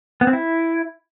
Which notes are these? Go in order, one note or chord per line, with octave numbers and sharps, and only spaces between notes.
B3
C4
E4